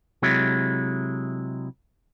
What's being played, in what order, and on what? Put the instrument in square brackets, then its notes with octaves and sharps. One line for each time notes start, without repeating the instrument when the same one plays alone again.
[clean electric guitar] C3 F#3 G#3 E4